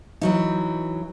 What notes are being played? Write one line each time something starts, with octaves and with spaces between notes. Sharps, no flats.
E3 F#3 D#4